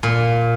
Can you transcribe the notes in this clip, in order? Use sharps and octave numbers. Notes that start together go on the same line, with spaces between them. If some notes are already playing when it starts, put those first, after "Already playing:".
A#2